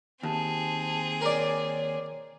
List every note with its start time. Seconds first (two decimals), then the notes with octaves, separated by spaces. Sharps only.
0.23 D#2 C4 G#4 A5
1.21 A#4 C#5 D5